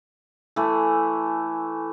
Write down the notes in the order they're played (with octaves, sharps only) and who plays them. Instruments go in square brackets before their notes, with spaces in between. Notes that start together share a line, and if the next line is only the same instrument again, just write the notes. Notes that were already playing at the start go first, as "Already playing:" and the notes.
[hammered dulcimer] E3 A3